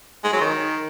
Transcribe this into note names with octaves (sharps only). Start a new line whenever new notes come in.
G#3
F#3
D#3